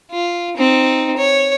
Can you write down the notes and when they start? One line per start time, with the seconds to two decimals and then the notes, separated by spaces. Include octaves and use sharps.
0.11 F4
0.57 C4 D#4
1.17 C#5